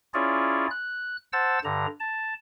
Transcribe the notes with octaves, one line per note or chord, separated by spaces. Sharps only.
C#4 E4 F4 G#4 C#5 D5
F#6
C5 F#5 A5 E6 A6
G2 D3 A#5
A5